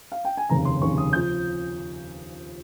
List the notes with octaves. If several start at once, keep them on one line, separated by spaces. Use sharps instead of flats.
F5
G5
G#5
F1 D#2 C#3 A#5
C6
F1 D#2 C#3 C#6
D#6
F3 G6